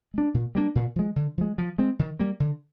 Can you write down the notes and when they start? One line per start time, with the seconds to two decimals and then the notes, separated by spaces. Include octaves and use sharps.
0.14 G#3 D4
0.34 A#2
0.55 G3 A#3 D4
0.75 A#2
0.96 F3 G#3
1.16 D3
1.38 F3 G#3
1.58 F3
1.78 G#3 C4
1.99 D#3
2.19 G3 A#3
2.40 D3